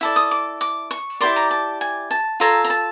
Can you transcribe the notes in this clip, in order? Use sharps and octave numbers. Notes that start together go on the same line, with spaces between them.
E4 A4 D5
D#6
D6
D6
C#6
E4 G4 A#4 D5 C6
A#5
A5
G#5
A5
F4 A4 C#5 A#5
A#5
A5